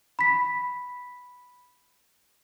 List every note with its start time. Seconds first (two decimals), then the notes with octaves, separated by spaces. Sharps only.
0.19 B5 B6